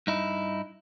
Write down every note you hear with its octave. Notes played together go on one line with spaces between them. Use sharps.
G2 D#4 E4